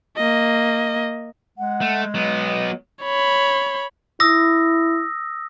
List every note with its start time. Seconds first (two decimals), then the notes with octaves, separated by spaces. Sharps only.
0.17 A#3 D#5
1.58 G#3 F#5
1.81 A3
2.14 F#3 B3 D#5
2.47 D#5
3.03 C#5 B5
4.20 E4 D#6 E6 A#6